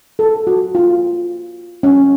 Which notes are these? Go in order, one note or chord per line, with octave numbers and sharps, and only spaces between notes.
A4
F#4
F4
C#4